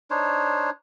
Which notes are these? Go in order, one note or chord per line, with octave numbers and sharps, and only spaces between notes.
D4 D#4 C5 C#5